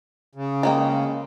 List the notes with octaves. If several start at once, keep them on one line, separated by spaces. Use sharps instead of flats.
C#3
G#3 A#3 G5